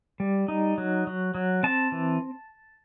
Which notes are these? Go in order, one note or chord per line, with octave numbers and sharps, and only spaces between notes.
G3
D#4
F#3
F#3
F#3
C4 A5
E3